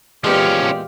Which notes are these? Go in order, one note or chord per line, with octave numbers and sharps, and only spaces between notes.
E2 A#2 F3 G#3 C#4 G4 F5